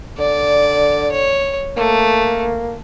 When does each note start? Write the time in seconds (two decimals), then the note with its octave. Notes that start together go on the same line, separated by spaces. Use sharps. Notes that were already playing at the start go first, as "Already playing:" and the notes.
0.19 D3 D5
1.12 C#5
1.77 A3 A#3